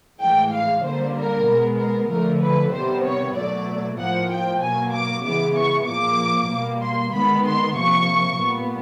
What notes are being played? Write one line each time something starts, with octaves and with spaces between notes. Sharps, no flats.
A2 E3 G#3 G5
F5
D3 G3 A#3 C5
A#4
B2 G#3 B3
A#4
D3 F3 A3 A#4
B4
C3 D#3 G3 B3 C5
C#5
B2 F#3 A3 D5
A2 F3 A#3 F#5
G5
B2 F#3 A#3 G#5
D6
C#3 E3 G#3 B3 D6
C#6
A#2 F3 A#3 D6
B2 G3 A#3
C6
D#3 G#3 B3 B5
C6
C3 F3 A#3 C#6
A#2 G3 B3